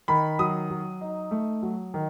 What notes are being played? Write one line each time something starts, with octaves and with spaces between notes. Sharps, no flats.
D#3 B5
F#3 D#6
F#3
D#4
A3
F#3
D#3